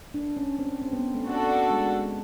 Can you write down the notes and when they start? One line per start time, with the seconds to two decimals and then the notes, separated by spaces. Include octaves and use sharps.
0.14 D4
0.37 C#4
0.59 C4
0.82 C4
0.93 B3
1.14 A3
1.26 D4 F#4 A4
1.71 G#3